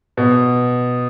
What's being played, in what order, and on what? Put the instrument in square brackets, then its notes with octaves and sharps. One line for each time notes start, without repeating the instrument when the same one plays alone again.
[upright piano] B2